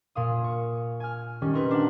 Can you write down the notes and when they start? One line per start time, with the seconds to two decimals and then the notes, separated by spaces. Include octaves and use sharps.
0.15 A#2 F5 D#6
0.44 C#6
1.00 G#5 F6
1.42 D#3 G3 C#4
1.54 C4 D#4 A#4 B4
1.71 D4 F#5